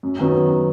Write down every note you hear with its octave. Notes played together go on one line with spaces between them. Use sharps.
F#2
D#3 F#3 B3